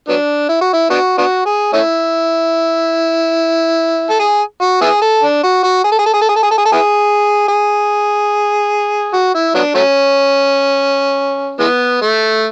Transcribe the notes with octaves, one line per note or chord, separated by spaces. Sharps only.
F#3 B3 D4
E4
F#4
E4
B3 D4 F#4
B3 D4 F#4
G#4
A3 C#4 E4
A4
G#4
F#4
B3 E4 G#4
A4
D4
F#4
F#4
G#4
A4
G#4
A4
G#4
A4
G#4
A4
G#4
A4
G#4
A4
B3 E4 G#4
G#4
F#4
E4
F#3 B3 D4
F#3 A3 C#4
E3 G#3 B3
A3